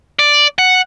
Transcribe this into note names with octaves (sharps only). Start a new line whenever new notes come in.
D5
F#5